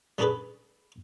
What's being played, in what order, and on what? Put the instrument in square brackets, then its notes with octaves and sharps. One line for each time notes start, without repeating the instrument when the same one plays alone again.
[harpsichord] G3 C#4 D4 G#4 A4 B4